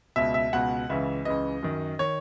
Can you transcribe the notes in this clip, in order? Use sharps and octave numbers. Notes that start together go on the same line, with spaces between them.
C#2 B2 E5
E5
C#2 B2 F#5
C#2 C#3 E3 E5
C#2 C#3 E3 D#5
F#2 D#3
D#3 C#5